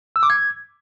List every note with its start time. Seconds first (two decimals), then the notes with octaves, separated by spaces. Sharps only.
0.16 E6
0.23 D6
0.30 G#6